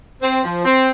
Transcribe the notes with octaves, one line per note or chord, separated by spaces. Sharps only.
C4
F3
C4